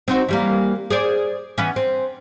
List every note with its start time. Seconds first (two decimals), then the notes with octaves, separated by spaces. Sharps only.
0.08 C4 D#4 F#4
0.29 E3 G3 A#3
0.90 G#4 C5 D5
1.58 E3 B3 C#4
1.76 C4